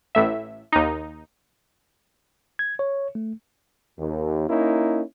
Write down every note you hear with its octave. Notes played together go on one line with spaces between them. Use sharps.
A1 A2 E5
D#2 D#4
G#6
C#5
A3
D#2
A#3 C#4 D#4 E4